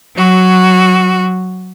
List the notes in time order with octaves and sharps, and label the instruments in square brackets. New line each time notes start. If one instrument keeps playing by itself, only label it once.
[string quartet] F#3 F#4